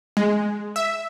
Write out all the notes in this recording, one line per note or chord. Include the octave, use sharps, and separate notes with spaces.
G#3
E5